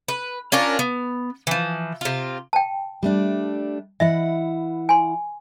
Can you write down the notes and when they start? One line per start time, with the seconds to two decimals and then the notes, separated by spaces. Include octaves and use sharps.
0.08 B4
0.52 C#4 D4 F4 A#4
0.79 B3
1.47 E3 F3
2.01 C3 F4
2.53 G5 A5
3.03 G3 A3 D4
4.00 E3 E4 D#5 E5 F#5
4.89 G#5 C6